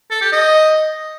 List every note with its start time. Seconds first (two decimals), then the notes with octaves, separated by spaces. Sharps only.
0.10 A4
0.21 G4
0.32 D#5